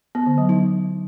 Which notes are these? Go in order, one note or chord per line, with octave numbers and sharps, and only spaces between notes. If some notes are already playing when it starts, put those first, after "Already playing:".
B3
D3
F#3
D#4